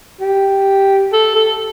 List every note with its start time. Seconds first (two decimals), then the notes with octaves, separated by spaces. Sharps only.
0.20 G4
1.13 A4
1.35 A4